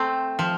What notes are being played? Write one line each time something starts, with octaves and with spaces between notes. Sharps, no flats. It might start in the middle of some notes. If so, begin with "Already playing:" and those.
Already playing: A3 C4
F3